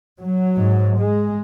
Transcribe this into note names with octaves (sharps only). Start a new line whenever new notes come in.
F#3
G#2
G#3